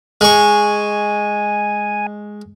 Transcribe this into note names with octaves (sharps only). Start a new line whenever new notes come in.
G#3 G#5 C#6